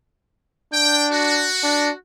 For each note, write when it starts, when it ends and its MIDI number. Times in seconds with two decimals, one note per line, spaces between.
0.73 1.49 62
0.73 1.07 79
1.12 1.95 66
1.64 1.91 62